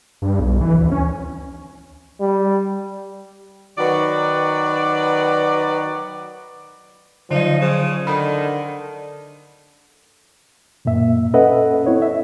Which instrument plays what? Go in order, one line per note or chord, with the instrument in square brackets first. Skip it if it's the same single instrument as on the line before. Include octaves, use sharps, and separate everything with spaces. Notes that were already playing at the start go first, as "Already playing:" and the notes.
[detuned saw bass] G2
B1
E3
D2
C#4
[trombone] G3
[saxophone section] D#3 F#3 F#4 B4 D5
[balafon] D3 F#3 D5 [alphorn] F3 [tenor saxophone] D#4
[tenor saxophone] C#3 [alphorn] C5
[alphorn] D3 [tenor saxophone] D#3 [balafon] B5
[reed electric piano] F#2 A#2 A#3 E5
C#4 A4 B4 D#5 E5 F#5
C4 E4 C#5
E5